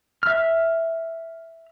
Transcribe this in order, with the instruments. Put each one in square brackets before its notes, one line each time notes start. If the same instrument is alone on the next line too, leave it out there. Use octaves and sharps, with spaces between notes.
[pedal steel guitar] E5 F6